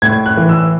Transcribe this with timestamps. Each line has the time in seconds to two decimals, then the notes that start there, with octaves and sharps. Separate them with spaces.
0.02 A2 G#6
0.26 F#6
0.37 E3
0.49 E6